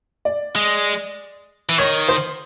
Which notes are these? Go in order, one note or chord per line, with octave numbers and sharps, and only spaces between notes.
D5
G#3
E3
D#3 C#5
C5